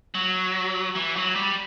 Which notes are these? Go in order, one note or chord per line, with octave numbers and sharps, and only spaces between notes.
F#3
E3
F#3
G3